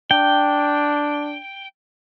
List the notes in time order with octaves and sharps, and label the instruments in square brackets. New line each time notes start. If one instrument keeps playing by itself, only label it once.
[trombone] D4 [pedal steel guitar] G5